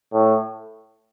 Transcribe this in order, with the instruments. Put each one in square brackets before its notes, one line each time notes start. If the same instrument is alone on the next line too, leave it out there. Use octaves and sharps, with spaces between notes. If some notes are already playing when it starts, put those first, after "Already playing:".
[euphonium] A2